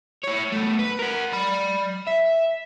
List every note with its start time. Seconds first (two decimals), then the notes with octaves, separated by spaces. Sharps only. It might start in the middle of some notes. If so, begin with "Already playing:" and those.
0.24 E4 C#5
0.52 A3 B3
0.79 B4
0.99 A#4 F#5
1.32 D5 B5
2.07 E5